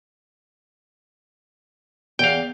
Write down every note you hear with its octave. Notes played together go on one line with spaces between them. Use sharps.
E2 F5 G5